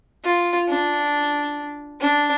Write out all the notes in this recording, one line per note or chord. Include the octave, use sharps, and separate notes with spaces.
F4
D4
D4